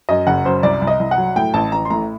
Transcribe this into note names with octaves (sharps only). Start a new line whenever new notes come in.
F#2 D#5
F#1 F#5
F#2 C5
C2 D5
C2
D#5
C2
F#5
F#3
A2 G5
A1 A5
A1 A#5
C6
A2 A#5